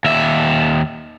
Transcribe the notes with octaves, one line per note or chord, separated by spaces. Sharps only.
D#2 E5